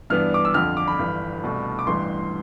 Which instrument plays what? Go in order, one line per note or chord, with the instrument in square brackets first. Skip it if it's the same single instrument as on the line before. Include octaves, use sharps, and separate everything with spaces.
[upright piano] G2 E3 B3 D4 F6
D6
E6
F2 D3 F3 F6
D6
B5
G1 G2 E3
C2 B2 A3
D6
A1 G2 E3 C6